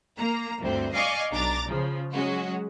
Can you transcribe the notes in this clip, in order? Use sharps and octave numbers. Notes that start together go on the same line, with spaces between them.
A#3 A#5
D2 G2 C4
D5 D#5 F5 G#5 C#6 D6
B1 D4 A#5 D6 A6
C#3 F3
F#3 G#3 C#4 F#4